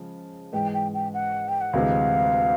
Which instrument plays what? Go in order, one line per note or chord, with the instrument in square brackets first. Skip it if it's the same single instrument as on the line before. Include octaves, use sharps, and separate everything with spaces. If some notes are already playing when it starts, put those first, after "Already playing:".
Already playing: [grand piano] C#3 F3 G#3
[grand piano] G#2 E3 G#3 [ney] G5
[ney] G5
G5
F#5
G5
F#5
[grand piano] D2 C3 E3 G#3 [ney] F5